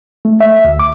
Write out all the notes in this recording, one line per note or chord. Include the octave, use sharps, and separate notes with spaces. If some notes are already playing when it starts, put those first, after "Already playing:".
A3
E5
D2
D6